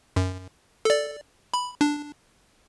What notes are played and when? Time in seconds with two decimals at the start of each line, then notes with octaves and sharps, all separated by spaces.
0.16 F#2
0.85 A4 D5
1.54 B5
1.81 D4